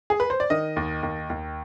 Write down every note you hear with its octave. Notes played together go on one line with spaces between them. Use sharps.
G#4
B4
C5
D5
D#3 D#5
D#2
D#2
D#2